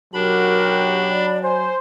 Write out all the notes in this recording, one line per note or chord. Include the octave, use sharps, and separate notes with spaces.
B1 F#3 D4 F#4 G4 A#4 B5
D5
C5 G#5